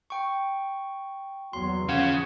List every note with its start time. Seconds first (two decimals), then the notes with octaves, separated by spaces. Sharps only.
0.10 G5 C#6
1.53 E2 F#3 C6
1.89 C#3 F3 C#4 F5 F#5 G#6